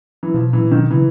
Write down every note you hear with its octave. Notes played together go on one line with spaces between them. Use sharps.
E3
B2 F3
A#2 E3
B2 D#3
C#3 E3